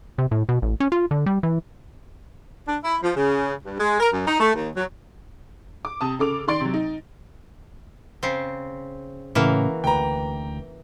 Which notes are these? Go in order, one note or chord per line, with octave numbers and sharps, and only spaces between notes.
C3
A2
B2
A1
C#4
F4
D3
G3
E3
D4
E4
F3
C#3
G2
G#3
A#4
F#2
D#4
A3
D#2
F#3
D6
C3 A5 D#6
C#3 A4 D6 F7
D#3 D5 C6 A6 D7
C3 F#3
D#4
C#3 C4
A2 C#3 E3 A#3 F#4
D2 B4 G5 A#5